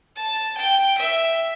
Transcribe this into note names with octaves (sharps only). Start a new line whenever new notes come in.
A5
G5
E5